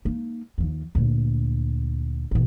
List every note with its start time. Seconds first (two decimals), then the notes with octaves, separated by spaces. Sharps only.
0.05 A#3 D#4
0.58 D#2 F3
0.95 D2 A#2
2.31 A1 B2